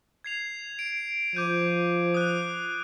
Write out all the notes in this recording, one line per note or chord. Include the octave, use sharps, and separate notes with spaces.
G#6 C7 F7
D7
F3 D6 G6 D#7
D#6 F#6